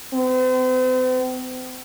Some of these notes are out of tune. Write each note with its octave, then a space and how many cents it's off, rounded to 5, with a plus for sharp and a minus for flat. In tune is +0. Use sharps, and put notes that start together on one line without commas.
C4 -40